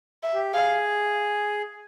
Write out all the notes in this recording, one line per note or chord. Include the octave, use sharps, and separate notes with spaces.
E5
G4
G#4 F5